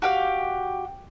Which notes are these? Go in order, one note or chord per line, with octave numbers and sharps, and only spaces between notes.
F#4 G4 F5